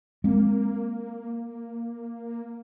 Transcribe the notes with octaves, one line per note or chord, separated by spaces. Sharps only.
G#3 A#3 C4